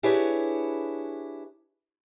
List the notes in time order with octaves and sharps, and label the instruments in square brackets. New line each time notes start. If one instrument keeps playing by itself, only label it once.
[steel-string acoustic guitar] D4 E4 G4 G#4 B4 C#5